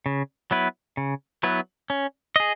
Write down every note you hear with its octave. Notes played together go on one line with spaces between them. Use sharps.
C#3
F#3 B3 E4 B4
C#3
F#3 B3 E4 B4
C#4
G#4 D#5